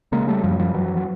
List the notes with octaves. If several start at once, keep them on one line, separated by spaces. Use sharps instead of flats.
C#3 G#3 A#3
G3 A3
F#2 F3 G3
F3 G3
F#2 E3 F#3
F#3